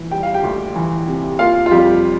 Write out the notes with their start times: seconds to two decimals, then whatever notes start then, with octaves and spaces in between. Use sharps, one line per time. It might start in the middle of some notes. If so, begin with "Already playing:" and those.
Already playing: E3
0.11 G3 G5
0.23 F5
0.34 G4 G5
0.43 D2
0.76 E3
1.08 C3
1.39 A#3 F4 F5
1.66 F4
1.71 F2 G3 G4